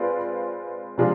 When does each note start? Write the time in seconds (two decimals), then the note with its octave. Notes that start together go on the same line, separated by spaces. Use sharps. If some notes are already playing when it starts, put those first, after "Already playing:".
Already playing: G#3 C4 F4 B4 D5
0.98 C3 F3 G#3 D4 F4